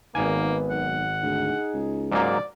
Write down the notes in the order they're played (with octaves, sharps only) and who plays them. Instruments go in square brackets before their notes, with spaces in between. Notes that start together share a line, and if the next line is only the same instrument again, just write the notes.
[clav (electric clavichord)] G#1 G#5 [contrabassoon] D#3 [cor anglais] A#3 [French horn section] B3 B4
[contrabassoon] B1 [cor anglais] F#5
[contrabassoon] D2 [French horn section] D#4 G#4
[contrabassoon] C#2
[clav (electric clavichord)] G#2 F#3 A#3 [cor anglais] D5